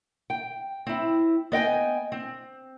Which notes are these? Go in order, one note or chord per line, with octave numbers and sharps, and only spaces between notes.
G5
C4 E4
B3 D#5 G5 G#5
C4